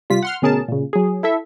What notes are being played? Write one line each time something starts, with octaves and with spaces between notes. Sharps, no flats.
C3 G3 F4 B6
F#5 C6 F6
D2 B2 C#4 G#4 A#4 A5
A#2 C#3
F#3 G#4
E4 A4 E5